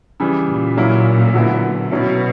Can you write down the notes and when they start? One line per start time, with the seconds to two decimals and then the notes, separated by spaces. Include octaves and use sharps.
0.20 C#3 E3 G3
0.49 A#2
0.77 F#3 A#3 C#4 E4
1.34 D3 F#3 B3 E4
1.91 B2 F#3 C#4 E4